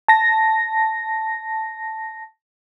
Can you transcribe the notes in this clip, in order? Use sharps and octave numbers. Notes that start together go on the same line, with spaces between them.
A5 A#6